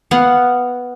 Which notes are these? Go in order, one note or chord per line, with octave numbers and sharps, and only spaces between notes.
B3 F5 F#5